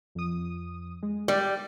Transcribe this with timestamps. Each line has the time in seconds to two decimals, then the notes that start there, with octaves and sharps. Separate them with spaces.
0.15 F2 D#6
1.03 G#3
1.28 G3 D5